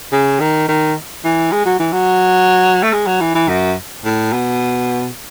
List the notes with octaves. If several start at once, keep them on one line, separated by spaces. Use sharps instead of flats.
C#3
D#3
D#3
E3
G#3
F#3
E3
F#3
A3
G#3
F#3
E3
E3
F#2
A2
B2